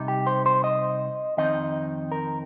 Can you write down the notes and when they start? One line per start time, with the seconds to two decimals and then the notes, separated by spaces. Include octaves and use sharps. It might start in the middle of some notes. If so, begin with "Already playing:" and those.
Already playing: C3 G3 D#4
0.08 G4
0.27 C5
0.46 C5
0.64 D#5
1.37 F2 D#3 C4 D#4 D#5
2.12 A#4